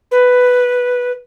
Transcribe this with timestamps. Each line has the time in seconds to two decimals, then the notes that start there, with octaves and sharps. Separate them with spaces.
0.12 B4